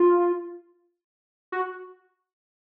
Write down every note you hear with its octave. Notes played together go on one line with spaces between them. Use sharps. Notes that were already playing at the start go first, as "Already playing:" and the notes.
Already playing: F4
F#4